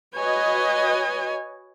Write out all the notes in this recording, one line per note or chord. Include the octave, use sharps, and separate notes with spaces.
F#4 B4 C#5 D#5 G#5